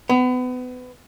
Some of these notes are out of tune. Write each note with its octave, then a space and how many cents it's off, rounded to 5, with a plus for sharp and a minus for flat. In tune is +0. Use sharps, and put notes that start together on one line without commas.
B3 +30